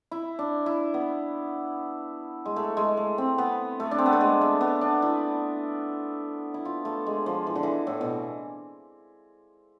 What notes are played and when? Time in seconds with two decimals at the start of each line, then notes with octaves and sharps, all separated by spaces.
0.11 E4
0.39 D4
0.66 E4
0.94 B3
2.45 G#3
2.56 A3
2.77 G#3
2.97 A3
3.18 C4
3.38 B3
3.80 A3
3.91 D4
3.98 C4
4.06 B3
4.13 A3
4.21 G#3
4.41 A3
4.61 B3
4.81 D4
5.02 E4
6.54 E4
6.65 F4
6.85 A3
7.06 G#3
7.26 F3
7.46 E3
7.56 D3
7.63 E3
7.87 A2
8.01 B2